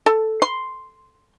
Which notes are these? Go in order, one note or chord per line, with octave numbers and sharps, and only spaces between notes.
A4
C6